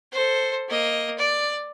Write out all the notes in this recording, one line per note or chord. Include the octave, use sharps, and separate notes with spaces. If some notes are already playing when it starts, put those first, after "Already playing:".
A4 C5
A#3 D#5
D5